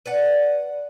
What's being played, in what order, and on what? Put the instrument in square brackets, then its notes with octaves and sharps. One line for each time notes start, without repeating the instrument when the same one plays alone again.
[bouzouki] B4 D5 F#5